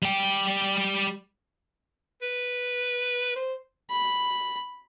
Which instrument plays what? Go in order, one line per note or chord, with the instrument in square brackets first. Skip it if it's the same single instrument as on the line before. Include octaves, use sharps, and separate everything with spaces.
[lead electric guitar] G3 G5
[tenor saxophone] B4
C5
[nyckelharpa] B5